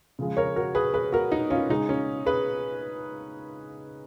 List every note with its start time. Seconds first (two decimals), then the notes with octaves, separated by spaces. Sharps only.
0.19 C#3 F3 G#3
0.37 A#4 C#5
0.56 F#4 A#4
0.75 G#4 B4
0.94 G#4 B4
1.12 F#4 A#4
1.32 D#4
1.50 C#4 F4
1.69 C#3 G#3 D#4
1.89 C#4
2.26 G#4 B4